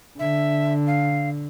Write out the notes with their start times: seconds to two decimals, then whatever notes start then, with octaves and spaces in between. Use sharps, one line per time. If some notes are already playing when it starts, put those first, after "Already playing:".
0.19 D3 E5
0.87 F5